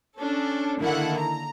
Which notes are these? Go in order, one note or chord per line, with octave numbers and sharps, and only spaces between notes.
C#4 D4 A4
D3 D#3 A#3 E4 A4 F#5
A#5